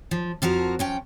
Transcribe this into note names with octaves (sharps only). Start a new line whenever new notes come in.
F3
F2 F3 F#4 A#4
F3 C#4 G5